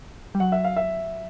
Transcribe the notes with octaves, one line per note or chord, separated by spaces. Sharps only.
G3
F#3 F#5
E5
F5
E5